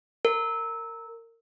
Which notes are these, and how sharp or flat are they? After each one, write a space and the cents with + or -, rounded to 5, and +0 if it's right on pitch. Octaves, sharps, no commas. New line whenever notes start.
A#4 -20